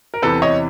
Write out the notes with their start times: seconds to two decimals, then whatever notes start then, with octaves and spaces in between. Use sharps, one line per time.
0.14 A#4
0.22 E2 C3 E3 A4 B4
0.42 C#5 D#5